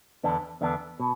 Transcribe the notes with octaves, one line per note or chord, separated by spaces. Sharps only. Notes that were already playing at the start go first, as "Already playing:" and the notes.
E2 D3 B3 D4
E2 D3 B3 D4
B2